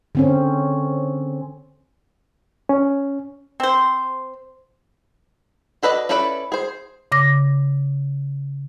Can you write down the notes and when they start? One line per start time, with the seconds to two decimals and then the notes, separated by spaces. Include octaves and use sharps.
0.15 D3 C4 C#4
2.69 C#4
3.60 C4 C5
5.83 F#4 A4 B4 D5 D#5
6.09 C#4 E4 A4 B4 D5
6.52 G#4 C5
7.12 C#3 D6 A#6